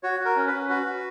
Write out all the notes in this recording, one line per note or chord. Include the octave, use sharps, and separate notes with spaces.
F#4 C#5
F#4
A#4
C#4
B4
C#4
F#4 B4
F#4